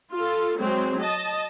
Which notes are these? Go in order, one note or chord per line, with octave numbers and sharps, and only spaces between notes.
F4 A4
F#3 G#3 C4
D#5 A5